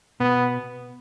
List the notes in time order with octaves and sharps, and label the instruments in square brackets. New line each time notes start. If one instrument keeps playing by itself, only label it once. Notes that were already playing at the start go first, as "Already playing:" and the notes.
[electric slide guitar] B2 [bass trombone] B3